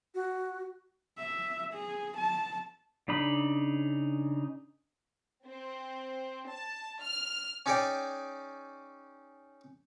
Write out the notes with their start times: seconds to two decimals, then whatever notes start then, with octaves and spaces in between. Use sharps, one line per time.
0.15 F#4
1.18 E5
1.74 G#4
2.17 A5
3.08 C#3 D4 D#4 B5
5.46 C4
6.49 A5
7.02 F6
7.66 C#4 D#4 G#4 C#5 D5 G5